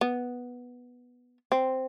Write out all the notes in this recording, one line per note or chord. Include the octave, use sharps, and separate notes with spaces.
B3
C4